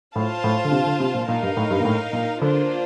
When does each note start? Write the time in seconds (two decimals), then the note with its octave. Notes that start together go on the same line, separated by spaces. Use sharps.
0.16 A2 F4 C5 F5 A5
0.44 A2
0.64 D3
0.72 C3
0.86 D3
1.00 C3
1.15 A#2
1.28 A#2 D#4 A#4 F5
1.43 G2
1.57 A2
1.71 G2
1.80 A#2
1.85 A2
2.13 A#2
2.41 D3 A#3 D4 F4 C5